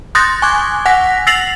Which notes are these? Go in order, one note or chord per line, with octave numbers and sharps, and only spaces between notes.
C6 D#6 F#6 G6 A6 A#6
G#5 C#6 D6 F#6 G#6
F#5 G#5 F#6 A#6 B6
E6 A6 A#6 C7 F7 F#7